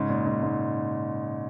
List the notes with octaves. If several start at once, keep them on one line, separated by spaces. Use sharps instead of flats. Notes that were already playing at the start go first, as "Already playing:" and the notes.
Already playing: G#2 C#3
A#2
G#2
G#2